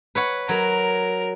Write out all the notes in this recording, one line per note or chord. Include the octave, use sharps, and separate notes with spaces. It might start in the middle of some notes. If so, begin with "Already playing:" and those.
B4 C#5 F#5
F#3 A#4